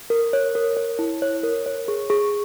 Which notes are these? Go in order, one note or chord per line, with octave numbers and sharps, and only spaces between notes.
A#4
C#5
A#4
C#5
E4
C#5
A#4
C#5
G#4
G#4